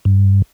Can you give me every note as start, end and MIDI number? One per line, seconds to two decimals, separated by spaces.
0.05 0.42 43